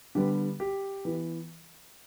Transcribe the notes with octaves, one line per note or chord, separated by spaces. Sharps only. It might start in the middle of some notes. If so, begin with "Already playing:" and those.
D3 G3 B3 G4
G4
E3 B3